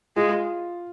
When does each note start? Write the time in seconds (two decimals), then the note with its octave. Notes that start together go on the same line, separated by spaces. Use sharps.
0.16 G#3 F4